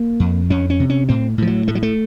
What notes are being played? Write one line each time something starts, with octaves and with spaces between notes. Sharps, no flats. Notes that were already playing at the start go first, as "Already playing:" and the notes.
Already playing: A#3
F2
F2 C#4
C#4
C3
C#4
A2 C4
A2 F3
F#3
A2 A3
F#3
A3